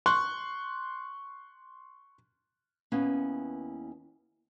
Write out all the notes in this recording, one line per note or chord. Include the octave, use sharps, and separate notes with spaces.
C6 C#6 F#6
D#2 B3 C#4 E4 B4 F5